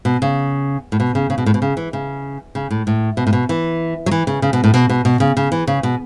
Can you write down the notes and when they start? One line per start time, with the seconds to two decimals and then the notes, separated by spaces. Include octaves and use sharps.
0.05 B2
0.22 C#3
0.92 A2
1.00 B2
1.15 C#3
1.30 C#3
1.38 B2
1.46 A2
1.54 B2
1.62 C#3
1.77 E3
1.93 C#3
2.55 C#3
2.71 A2
2.87 A2
3.17 B2
3.27 A2
3.33 B2
3.49 E3
4.06 F#3
4.11 E3
4.27 C#3
4.42 C#3
4.53 B2
4.64 A2
4.74 B2
4.89 B2
5.05 B2
5.20 C#3
5.37 C#3
5.52 E3
5.67 C#3
5.83 B2